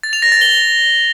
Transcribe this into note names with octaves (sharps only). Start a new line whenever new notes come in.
A6
F7
A#6
A6
G7